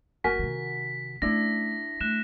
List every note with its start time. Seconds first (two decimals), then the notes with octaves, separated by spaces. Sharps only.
0.24 F#1 F#4 A#4 G#5 B6
0.39 C3 D#3
1.22 A3 C#4 D4 E4 A#6
2.01 A3 F#6 E7